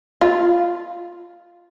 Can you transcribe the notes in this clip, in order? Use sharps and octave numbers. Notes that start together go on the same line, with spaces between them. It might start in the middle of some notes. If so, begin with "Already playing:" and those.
F4